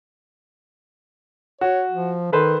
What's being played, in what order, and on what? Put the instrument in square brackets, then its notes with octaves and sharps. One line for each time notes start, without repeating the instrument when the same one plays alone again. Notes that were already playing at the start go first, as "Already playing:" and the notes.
[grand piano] F#4 [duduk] C#5
[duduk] F3
[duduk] D#3 [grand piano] A4 B4 C5